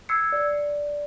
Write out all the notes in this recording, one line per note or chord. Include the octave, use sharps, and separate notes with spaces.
E6 G#6 C7 C#7
D5